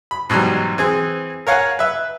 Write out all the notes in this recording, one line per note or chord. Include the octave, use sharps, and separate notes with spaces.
B5
G#2 B2 E3 F#3 G3
E3 C4 G#4
A#4 C#5 F5 F#5 G#5
B4 E5